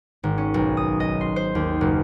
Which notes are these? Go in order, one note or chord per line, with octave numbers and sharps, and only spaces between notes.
G#1
C#4
B1
D#6
D#5
C6
C5
D#2
F#1